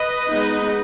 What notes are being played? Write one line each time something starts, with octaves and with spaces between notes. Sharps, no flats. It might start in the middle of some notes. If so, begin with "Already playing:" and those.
Already playing: B4 D#5
G#3 B3 D#4